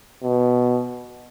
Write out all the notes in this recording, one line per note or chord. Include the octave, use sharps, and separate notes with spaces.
B2